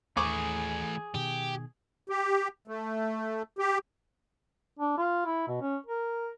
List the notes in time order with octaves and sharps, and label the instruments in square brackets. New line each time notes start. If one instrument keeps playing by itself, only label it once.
[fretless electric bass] D#2 [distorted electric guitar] E3 A3 [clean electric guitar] G#4 [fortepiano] C#6 D6
[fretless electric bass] B2 D#3 [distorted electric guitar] G4
[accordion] G4
A3
G4
[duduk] D4
F4
E4
B2
C#4
A#4